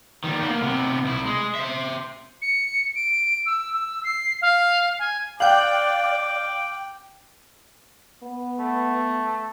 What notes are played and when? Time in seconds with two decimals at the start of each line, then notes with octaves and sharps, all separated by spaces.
0.24 D#3 G3
0.40 A#3 B3
0.62 C3 B3
1.05 C2 E4
1.26 G#3
1.55 C5 E5
2.42 C#7
2.96 D7
3.46 E6
3.73 E6
4.04 C7
4.42 F5
4.99 G#5
5.40 D5 F5 G5 D6 F#6 G6 F#7
8.23 B3
8.60 A3